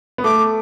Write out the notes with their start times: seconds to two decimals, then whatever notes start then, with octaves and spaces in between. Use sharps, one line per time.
0.18 B3
0.24 A3 D6